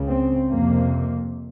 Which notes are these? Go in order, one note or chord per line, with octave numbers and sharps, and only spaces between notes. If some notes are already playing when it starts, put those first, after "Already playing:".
Already playing: C#2 C#3
C4
F2 C3 A#3